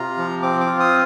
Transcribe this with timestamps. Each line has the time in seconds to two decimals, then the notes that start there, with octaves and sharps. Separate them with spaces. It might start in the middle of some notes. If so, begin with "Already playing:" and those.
Already playing: C3 F4 A#5
0.18 F3
0.42 C4 D6
0.60 D6
0.67 F4
0.80 D#6